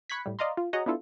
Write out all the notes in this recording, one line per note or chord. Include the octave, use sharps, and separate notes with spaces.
B5 C#6 F#6 G#6 B6
A2 G3
D5 D#5 F5 A#5 C6
F4
F#4 G#4 C#5 D#5 F#5 A#5
B3 D4 E4 F4 A4